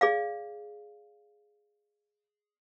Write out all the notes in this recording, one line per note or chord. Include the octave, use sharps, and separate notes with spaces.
G#4 D5 F5